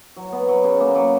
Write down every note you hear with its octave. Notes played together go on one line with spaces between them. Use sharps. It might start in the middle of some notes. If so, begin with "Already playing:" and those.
F#3
B3
F#3
C#3
A#3
F#3